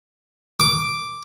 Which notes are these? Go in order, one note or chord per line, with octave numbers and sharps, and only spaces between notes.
D6